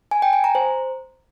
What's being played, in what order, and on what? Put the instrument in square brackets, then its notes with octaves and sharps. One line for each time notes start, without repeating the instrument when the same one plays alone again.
[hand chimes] G#5
G5
G#5
A#5
C5